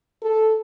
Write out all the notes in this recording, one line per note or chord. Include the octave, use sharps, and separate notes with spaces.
A4